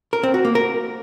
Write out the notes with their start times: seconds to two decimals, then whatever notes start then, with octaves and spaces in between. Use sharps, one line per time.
0.13 A#4
0.23 C4
0.34 F#4
0.45 A#3
0.55 A#4